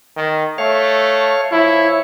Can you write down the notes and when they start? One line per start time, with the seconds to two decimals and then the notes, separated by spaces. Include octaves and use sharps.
0.17 D#3
0.58 A3 C#5 F5
1.52 F3 E4 C#5